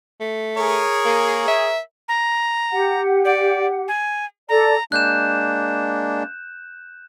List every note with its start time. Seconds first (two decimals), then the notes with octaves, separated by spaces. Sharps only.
0.20 A3
0.57 G#4 A#4 C#5
1.05 A#3
1.48 E5
2.08 A#5
2.72 G4 F#5
3.25 D5
3.88 G#5
4.49 A4 D5 A#5
4.92 G#3 A#3 D4 F#6 G6 E7